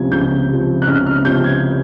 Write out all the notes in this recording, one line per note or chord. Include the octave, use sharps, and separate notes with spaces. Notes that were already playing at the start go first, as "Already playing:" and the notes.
Already playing: C#2 C3 F3 G#6
C#2 G6
C3 F3
F#6
C#2 F6
F6
C3 F3 G6
G#6